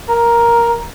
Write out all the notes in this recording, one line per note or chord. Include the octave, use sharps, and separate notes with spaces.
A#4